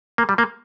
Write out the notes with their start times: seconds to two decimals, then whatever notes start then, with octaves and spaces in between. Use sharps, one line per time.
0.18 A#3
0.29 G3
0.38 A#3